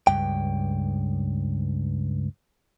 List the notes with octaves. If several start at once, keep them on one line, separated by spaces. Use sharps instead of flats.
C#2 G2 G5